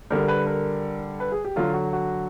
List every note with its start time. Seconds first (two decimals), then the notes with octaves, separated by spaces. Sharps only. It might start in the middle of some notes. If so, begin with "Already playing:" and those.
0.10 D3 G3 A#4
0.28 B4
0.47 A#4
1.20 B4
1.32 G#4
1.45 G4
1.56 D3 F#3 F4
1.74 F#4
1.93 F#4